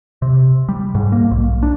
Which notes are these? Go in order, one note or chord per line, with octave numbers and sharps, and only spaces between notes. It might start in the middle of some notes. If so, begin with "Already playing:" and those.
C3
G3
G#2
A#3
B1
D4